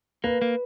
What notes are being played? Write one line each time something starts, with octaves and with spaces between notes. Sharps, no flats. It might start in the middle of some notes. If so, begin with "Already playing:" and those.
A#3 B4
A#3